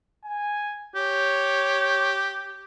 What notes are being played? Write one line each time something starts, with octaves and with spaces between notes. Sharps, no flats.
G#5
G4 C#5